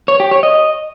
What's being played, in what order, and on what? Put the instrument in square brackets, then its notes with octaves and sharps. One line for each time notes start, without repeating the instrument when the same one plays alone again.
[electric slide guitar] C#5
G4
C#5
D#5